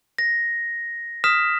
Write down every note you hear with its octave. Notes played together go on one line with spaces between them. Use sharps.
A#6
D#6 F6 B6 E7